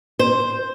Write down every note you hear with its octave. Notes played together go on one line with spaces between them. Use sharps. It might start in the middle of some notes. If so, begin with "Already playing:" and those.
C5